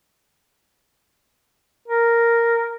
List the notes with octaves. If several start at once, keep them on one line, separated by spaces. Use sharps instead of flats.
A#4